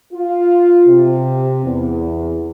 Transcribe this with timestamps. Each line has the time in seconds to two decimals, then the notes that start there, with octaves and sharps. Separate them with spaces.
0.13 F4
0.87 C3
1.63 E2